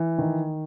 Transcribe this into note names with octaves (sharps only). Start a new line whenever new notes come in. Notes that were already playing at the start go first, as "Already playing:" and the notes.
Already playing: E3
D#3